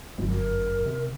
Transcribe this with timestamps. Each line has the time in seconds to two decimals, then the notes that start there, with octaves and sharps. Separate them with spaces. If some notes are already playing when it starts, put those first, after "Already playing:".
0.18 G1 F#2
0.30 F#2 A#4
0.86 C3